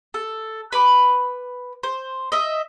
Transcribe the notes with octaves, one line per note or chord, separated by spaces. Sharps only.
A4
B4 B5 D6
C5
D#5 E5